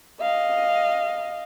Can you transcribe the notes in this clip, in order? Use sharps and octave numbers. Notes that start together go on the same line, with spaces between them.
D#5 F5